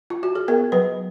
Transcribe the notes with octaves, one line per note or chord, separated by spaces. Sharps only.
F4
F#4
G#4
B3 A#4
F#3 B4